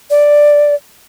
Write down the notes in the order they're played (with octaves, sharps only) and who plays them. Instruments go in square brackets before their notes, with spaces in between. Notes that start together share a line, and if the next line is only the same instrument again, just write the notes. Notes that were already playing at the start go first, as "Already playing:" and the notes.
[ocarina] D5